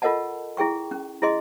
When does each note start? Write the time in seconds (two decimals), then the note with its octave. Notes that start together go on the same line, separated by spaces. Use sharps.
0.02 F4 A4 A#4 D#5 F#5 A5
0.57 E4 G#4 G5 C#6
0.91 C#4
1.22 E4 G#4 D#5 C6